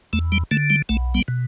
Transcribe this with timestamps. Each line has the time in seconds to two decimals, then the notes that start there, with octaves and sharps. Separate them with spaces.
0.13 E2 A3
0.32 G3
0.51 D3 A3
0.70 G3
0.89 B1 A3
1.15 G3 B3
1.28 B2